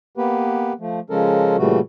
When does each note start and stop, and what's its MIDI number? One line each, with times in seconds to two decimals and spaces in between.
0.17 0.73 58
0.17 0.73 59
0.17 0.73 67
0.17 0.73 71
0.80 1.00 53
0.80 1.00 57
1.10 1.56 49
1.10 1.56 53
1.10 1.56 56
1.10 1.56 61
1.10 1.56 69
1.10 1.56 70
1.58 1.80 46
1.58 1.80 49
1.58 1.80 52
1.58 1.80 55
1.58 1.80 57
1.58 1.80 66